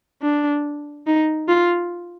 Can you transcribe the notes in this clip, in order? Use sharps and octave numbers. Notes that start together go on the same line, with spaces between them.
D4
D#4
F4